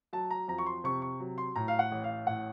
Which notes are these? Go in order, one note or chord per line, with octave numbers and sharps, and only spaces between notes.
F#3 A5
A#5
F2 A#5
C#6
C6
C3 C#6
C#6
F#3
C6
A2 A#5
F5
F#5
A1
F5
A2 F#5